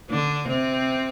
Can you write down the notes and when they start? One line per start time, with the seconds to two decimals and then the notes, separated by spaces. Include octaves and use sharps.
0.10 D3 D4
0.48 C3 C4